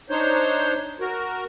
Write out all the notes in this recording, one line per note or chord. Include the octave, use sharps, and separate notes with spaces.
D4 D#4 C5 C#5 G6
F#4 A#4